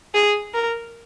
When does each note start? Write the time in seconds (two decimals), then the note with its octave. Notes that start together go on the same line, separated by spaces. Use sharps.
0.14 G#4
0.54 A#4